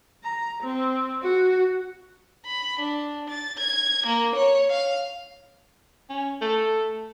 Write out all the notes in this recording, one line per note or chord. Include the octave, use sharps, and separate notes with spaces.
A#5
C4
F#4
B5
D4
A6
G#6
A#3
C#5
F5
C#4
A3